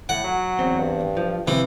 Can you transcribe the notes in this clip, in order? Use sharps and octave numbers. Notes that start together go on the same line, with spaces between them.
A2 F#5
F#3
E2 C4
G2
F3
C3 E3 F3